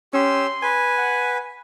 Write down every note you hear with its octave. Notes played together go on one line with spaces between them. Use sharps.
C#4 G4 C6 E6
B4 G#5
F#5